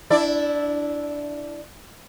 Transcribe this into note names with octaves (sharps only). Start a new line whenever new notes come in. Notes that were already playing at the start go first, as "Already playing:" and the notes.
D4 E4 D5